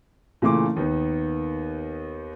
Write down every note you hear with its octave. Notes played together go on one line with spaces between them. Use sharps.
A#2 C#3 E3 A3 C6 D6
D#2 D#3 B3